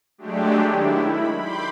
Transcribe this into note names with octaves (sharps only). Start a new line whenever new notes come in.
F#3 G#3 A3 D4 G4
D#3 E4
B5
B5 C6 D6 G6